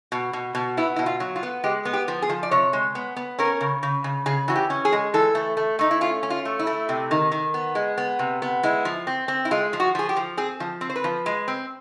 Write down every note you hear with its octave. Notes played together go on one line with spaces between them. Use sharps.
B2
B2
B2
B3 E4
B2 E4
F4
F#3
F4
B3
G#3 G4
B3
G4
F3
G#4
F3
D5
C3 C#5
G#3
B3
B3
C#4 A#4
C#3
C#3
C#3
C#3 G#4
E3 F#4
G4
C#4
G#4
G#3
E3 A4
A3
A3
A3 D#4
E4
C#4 F4
C#4
F4
A3
E4
A3
C3
D#3
D#3
B3
G#3
B3
C3
B3
G#3 E4
F3
C4
C4
E4
G#3 F4
F3
F#4
F3 G#4
G4
F3
C4 G#4
F3
C4
C5
B4
F3
G#3
C4